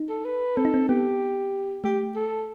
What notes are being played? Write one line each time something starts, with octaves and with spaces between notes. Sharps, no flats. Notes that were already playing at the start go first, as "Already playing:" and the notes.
Already playing: D#4
A4
B4
C4 A4
D#4
C4
B3 G4
A3 G4
A4